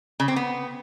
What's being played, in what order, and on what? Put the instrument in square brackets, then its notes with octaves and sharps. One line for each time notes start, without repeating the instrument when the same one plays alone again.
[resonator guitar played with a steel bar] C#3
C4
B3